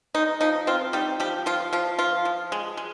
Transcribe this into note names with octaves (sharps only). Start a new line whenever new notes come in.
G#3 D#4
F3 D#4
C4 F4
G3 D#4 G4
F3 G3 G4
F3 F4
F3 F4
F3 F4
F3
G#3
G#3